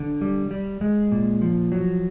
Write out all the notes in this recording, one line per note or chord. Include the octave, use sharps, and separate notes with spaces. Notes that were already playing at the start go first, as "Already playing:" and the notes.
Already playing: D3
G3
G3
G#3
A#2
F3
F#3